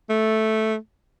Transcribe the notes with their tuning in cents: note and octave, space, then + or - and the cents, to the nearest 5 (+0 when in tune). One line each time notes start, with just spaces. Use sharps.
A3 -5